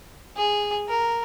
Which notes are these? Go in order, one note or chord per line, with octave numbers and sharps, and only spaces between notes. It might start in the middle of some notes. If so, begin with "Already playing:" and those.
G#4
A#4